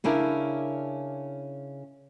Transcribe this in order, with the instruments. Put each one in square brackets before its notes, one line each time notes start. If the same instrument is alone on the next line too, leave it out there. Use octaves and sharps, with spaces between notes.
[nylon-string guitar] C#3 C#4 D4 E4 A#4